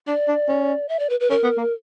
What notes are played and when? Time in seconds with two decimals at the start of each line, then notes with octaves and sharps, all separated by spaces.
0.07 D4 D5
0.28 D4
0.48 C#4
0.89 E5
0.99 D5
1.10 B4
1.20 B4
1.30 C#4 A#4
1.44 B3
1.57 A#3